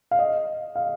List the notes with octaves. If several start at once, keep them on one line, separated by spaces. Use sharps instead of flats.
F5
D#5
F5